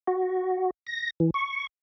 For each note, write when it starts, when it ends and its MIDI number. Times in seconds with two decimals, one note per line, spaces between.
0.07 0.70 66
0.86 1.10 94
1.20 1.30 52
1.34 1.67 85